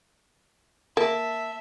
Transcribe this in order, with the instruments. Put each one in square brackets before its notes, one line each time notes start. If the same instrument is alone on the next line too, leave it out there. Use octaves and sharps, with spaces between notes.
[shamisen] A#3 [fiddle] E5 [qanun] A5